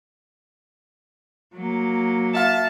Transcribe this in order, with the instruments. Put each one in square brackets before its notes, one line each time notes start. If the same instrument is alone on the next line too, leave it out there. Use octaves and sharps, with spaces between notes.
[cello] F#3 A#3
[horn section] E5 F5 A5